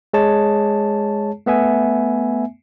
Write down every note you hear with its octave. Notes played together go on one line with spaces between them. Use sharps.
G#3 G#4 C#5 A5
A3 B3 E5 G#5